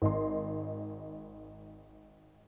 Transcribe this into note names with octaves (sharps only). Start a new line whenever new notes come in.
G#1 D#5 C6